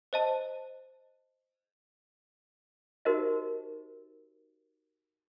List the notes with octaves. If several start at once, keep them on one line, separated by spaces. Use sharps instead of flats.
C5 D#5 A5
D#4 F#4 G4 A#4 C5 D#5